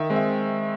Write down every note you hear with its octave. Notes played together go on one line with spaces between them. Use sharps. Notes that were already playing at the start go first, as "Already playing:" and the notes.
Already playing: D#3 E5
G#3 C4
E5